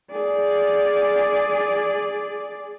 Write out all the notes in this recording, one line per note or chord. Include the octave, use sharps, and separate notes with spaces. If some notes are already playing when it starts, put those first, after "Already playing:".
G#4 D5